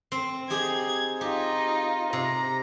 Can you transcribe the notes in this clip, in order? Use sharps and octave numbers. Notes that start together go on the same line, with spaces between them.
C4
D#4 G4 G#4 G#6
D#4 F4 G4
C3 A#5